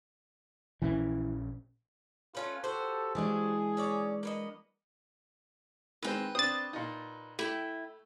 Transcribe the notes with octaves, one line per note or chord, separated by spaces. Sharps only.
A#1 A#2 E3 C#4
A3 C#4 F4 B4
F#4 G4 A4 C5
E3 G#3 D4 G#4
C#4 C#5 D5
A#3 B3 D#5
D#3 G#3 C4 B4 G5
C4 D4 D#6 A6
A#2 D#4
A3 E4 G5